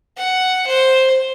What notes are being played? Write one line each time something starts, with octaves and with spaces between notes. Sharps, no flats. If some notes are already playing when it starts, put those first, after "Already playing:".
F#5
C5